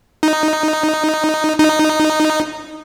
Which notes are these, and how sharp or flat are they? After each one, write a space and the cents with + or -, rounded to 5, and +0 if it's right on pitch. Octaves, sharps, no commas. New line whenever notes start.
D#4 -5
D#4 -10